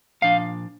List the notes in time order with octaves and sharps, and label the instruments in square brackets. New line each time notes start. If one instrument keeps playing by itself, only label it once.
[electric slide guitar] A#2 F3 D4 F5